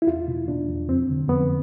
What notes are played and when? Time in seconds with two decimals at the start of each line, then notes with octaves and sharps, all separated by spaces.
0.02 E4
0.07 E2 F4
0.28 B2
0.48 B2 D4
0.68 E2
0.88 F2 C4
1.09 D3
1.29 F2 B3